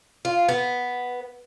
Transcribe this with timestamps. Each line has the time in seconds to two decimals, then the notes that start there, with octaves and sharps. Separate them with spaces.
0.25 F4
0.49 B3